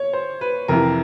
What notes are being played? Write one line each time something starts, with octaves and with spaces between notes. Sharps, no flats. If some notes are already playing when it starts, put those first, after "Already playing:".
Already playing: C#5
C5
B4
F2 C3 E3 A#4